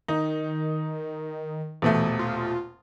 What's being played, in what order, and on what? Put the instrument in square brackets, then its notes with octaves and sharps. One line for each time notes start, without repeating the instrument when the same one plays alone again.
[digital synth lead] D#3 [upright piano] D#4
[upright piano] D#1 B2 A3 [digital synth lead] E3
[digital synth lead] F4